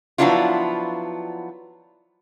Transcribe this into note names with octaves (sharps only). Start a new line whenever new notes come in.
F3 F#3 B3 D4 E4 F4